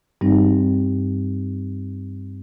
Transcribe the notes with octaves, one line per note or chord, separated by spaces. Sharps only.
G2 G3 C4 D#4